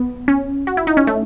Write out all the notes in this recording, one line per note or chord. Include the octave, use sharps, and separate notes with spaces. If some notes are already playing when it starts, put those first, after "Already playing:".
Already playing: B3
C#4
F#4
E4
D#4
C#4
A3